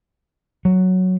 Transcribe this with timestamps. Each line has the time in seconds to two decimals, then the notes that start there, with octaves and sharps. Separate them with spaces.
0.65 F#3